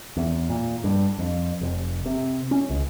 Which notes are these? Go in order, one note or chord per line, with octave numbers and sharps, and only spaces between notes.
E2
A#2
G2
F2
F1
C3
C#4
C#2